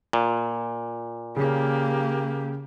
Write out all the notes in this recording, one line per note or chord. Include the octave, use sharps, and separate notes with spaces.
A#2
C#3 A#3 G4